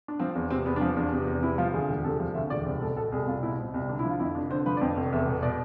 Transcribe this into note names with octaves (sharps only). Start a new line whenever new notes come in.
D4
F3 C4
E2
C3 C4
E2 B3
D4
F3 C4
E2 D4
C3
E2
C3 E4
F3 F4
D2 G#4
E1
C3 A4
F3
D2 E5
E1 D5
C2 C5
B2 A4
B2 A4
C2 G#4
C2 F4
B2 E4
B2 C4
C2
D3 D4
E4
F3 F4
F2 E4
F1 D4
D3 C5
F3 B4
D5
F2 C5
F1
E2 E5
B2
B2 D5